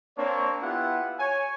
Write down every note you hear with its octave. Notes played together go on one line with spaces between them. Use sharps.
A#3 C4 D4 C#5
B3 E4 F4 G4 F#5
C#5 G#5